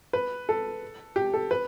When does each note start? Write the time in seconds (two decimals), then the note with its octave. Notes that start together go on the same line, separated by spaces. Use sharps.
0.13 B4
0.49 A4
1.16 G4
1.34 A4
1.51 B4